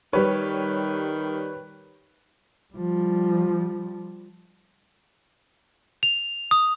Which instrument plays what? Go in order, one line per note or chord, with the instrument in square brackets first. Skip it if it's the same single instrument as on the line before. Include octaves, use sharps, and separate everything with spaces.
[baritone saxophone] D#3 [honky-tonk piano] G3 C#5 [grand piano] B4
[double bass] F3 G3
[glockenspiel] F7
D#6